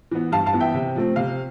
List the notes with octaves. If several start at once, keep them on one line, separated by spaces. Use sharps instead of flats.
E3 B3
G2 F5 A5
F5 A5
E3 B3
E5 G5
C3
F3 A3 C4
C3 F5